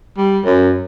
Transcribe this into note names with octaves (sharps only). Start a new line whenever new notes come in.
G3
F#2